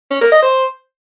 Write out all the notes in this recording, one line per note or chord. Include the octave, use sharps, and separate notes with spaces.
C#4
A#4
D#5
C5